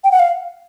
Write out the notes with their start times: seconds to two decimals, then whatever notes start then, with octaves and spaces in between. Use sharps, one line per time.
0.04 G5
0.12 F#5
0.19 F5